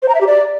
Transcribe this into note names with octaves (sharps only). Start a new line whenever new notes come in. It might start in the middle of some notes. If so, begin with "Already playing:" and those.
C5
A#5
E5
G4
D5